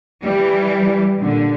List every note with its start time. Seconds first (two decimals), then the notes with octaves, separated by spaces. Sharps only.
0.22 E3 G3
1.17 A#2 D3